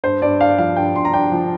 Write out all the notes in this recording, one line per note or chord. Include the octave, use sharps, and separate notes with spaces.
G2 C5
G2 D5
D4 F5
F3 F5
G2 G5
G2 C6
A#5
D4 G5
F3